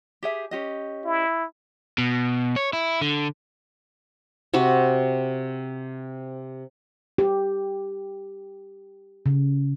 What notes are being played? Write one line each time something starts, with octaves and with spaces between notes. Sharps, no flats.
G4 G#4 E5
C#4 G4 D#5
E4
B2
C#5
E4
D3
C3 C4 F#4
G4
C#3